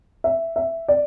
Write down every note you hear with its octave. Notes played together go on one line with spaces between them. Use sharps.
E5
E5
D5